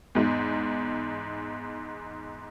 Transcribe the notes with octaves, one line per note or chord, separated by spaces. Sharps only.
E2 G#2